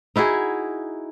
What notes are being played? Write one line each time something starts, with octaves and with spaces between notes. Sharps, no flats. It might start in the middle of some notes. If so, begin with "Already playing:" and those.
D#4 E4 F#4 G#4